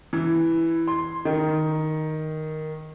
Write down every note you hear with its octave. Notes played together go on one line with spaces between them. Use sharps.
E3
C6
D#3